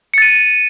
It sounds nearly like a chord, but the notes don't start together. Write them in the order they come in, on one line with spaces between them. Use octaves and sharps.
C#7 A6 D#7